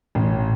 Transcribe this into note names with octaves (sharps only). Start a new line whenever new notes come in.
A1